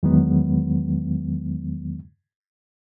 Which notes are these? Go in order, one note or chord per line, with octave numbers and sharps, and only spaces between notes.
E2 D#3 F#3 G#3 B3